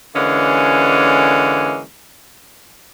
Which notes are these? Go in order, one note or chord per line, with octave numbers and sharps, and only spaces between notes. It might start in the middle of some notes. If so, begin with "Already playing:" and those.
D3 E3 G#3 A#3 C#4